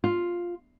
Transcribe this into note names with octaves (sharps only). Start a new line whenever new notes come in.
F4